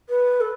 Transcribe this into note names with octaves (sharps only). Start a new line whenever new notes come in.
B4
A4